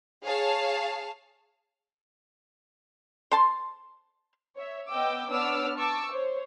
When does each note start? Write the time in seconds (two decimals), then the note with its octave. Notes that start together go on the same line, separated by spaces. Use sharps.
0.24 G#4 C#5 F5 A5
3.31 C5 A5 C6
4.56 C#5 E5
4.88 B3 D#5 G5 D6 E6
5.30 B3 D4 C#5 D6 E6 F6
5.77 A5 C#6 D6 E6
6.10 C5 C#5